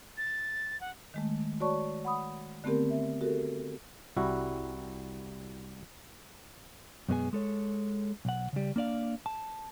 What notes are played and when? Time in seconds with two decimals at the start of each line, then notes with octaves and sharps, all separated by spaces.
0.17 A6
0.81 F#5
1.14 D#3 G#3 A3
1.60 F#4 C#5 D5 A5 C#6
2.05 F#5 B5 D#6
2.64 D3 A3 B3 C4 G4 A#4
2.90 E5
3.21 F#4 G4 A4 A#4
4.17 C2 G3 E4 F#4
7.09 F#2 B2 G#3 B3 G#4 G#5
7.33 G#3 A4 C#5
8.25 B1 F#5
8.53 C#3 G3
8.76 A#3 D4 D5 F5
9.26 A5